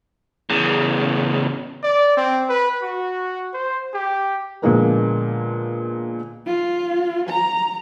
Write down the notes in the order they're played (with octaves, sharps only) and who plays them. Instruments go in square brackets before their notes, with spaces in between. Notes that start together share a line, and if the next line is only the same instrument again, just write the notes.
[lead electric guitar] E2 C#3
[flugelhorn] D5
C4
B4
F#4
C5
G4
[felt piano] A#2 D3 F3 G#3 A#3 B3
[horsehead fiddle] F4
A#5